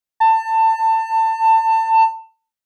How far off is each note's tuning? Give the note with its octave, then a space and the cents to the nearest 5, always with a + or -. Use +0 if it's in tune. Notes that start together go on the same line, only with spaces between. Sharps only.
A5 +25